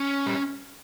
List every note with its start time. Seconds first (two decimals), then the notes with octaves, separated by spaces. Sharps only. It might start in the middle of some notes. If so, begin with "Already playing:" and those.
Already playing: C#4
0.26 G3